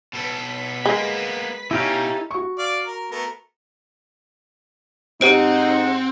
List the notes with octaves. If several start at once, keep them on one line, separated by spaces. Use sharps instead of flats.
B2 A4 B4 B6
G#3 A#3 B3
B2 C#4 D#4 E4 G4 A4 F5
F#4 C#6
D5 F5
A#4
A3 B3 A#4
G#2 C4 D#4 G4 C5 F#5 D7